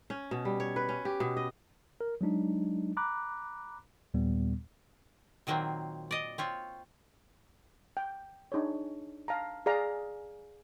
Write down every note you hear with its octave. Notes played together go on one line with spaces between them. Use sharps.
C#4
B2
G3
C#5
B4
C#4
G4
B2
D#5
A#4
F#3 G#3 D4 D#4
A#5 B5 D6 F#6
D#2 A#2 G3 B3
A#2 D#3 F#3 A#3 C4
D5 D#5
C4 F4 C#5
G5
D4 D#4 G#4 C#5
F5 A5 A#5
G#4 D5 F5 A#5